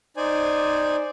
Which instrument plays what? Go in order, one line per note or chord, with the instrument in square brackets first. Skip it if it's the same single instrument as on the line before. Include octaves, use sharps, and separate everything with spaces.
[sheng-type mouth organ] D#4 C5 D5 G#5